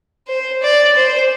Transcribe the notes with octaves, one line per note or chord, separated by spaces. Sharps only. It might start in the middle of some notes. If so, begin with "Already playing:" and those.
C5
D5
C5